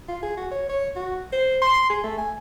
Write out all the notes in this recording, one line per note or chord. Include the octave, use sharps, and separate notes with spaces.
F4
G#4
F#4
C#5
C#5
F#4
C5
C6
G#4
A3
G#5